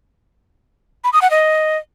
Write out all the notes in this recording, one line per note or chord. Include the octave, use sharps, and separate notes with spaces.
B5
D#6
F#5
D#5